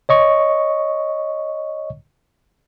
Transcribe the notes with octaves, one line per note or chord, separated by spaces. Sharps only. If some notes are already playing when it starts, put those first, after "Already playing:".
C#5 D#5 C#6